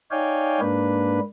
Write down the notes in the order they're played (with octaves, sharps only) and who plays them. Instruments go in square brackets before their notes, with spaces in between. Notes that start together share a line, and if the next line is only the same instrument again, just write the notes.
[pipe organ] D#4 C#5 D5 F5 G5 G#5
G#2 A#3 D4 B4